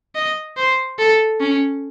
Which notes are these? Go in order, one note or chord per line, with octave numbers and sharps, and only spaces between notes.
D#5
C5
A4
C#4